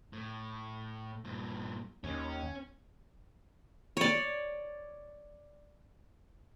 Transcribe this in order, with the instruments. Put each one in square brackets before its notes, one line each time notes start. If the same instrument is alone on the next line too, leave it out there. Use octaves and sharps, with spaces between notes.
[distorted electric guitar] A2
G2 A#2
[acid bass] D#2 [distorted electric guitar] C#4
[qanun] C#5 D5